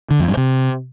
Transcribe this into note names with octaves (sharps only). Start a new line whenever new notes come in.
D3
F2
G2
C3